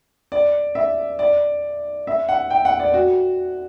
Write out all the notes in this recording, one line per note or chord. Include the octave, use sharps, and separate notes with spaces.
D5
E5
D5
E5
F#5
G5
F#5
D5
F#4